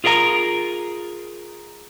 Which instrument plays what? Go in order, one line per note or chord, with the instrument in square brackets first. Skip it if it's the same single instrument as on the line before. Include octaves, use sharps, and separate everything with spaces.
[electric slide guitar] F4 G#4 A#4 D#5 A#5